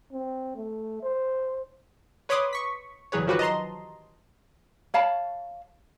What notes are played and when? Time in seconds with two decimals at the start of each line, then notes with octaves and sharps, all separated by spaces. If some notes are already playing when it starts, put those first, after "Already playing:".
0.12 C4
0.56 A3
1.03 C5
2.29 B4 C#5 B5 C6 D6 D#6
2.53 C#6 B6
3.12 G1 E3 F#3 G#4 B4 C#5
3.27 D#3 F3 F#3 F#4 G4 B4
3.39 D#5 A5 A#5 C6
4.94 C#5 F5 A5 B5